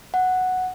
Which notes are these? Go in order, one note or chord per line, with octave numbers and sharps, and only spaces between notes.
F#5